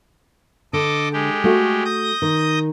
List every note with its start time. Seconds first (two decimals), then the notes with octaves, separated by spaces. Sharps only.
0.73 D3 A4 D#5 D6
1.13 G#3 G4
1.44 A3 F#4
1.85 D#6 G6 A#6
2.22 D#3